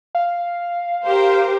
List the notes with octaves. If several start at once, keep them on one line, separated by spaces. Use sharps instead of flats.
F5
G4 A#4 C5